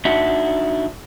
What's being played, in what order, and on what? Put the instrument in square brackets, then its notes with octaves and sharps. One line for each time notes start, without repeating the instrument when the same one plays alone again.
[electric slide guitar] D4 D#4 F#4 E5 F#5